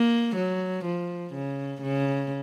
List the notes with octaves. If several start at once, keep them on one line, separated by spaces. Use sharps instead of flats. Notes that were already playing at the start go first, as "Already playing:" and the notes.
Already playing: A#3
F#3
F3
C#3
C#3